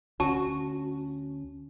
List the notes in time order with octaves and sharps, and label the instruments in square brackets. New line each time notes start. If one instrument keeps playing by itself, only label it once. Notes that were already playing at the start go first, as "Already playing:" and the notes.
[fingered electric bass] D2 [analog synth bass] C#4 [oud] F#4 [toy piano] A5